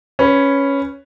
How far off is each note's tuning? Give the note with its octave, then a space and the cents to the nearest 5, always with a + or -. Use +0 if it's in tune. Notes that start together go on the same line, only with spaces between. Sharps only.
C#4 +0 B4 +0